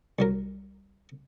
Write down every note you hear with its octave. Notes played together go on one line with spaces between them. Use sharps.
C2 F#3 A#4